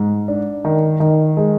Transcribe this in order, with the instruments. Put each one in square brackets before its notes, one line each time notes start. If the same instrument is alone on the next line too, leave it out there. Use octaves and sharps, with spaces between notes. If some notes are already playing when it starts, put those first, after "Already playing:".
Already playing: [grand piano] G#2
D4
D#3
D#3
G#3